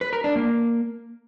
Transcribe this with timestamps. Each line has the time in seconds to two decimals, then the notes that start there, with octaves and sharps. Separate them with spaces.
0.01 B4
0.13 A#4
0.24 D4
0.36 A#3